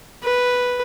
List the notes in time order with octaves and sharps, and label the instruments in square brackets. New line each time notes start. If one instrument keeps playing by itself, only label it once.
[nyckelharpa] B4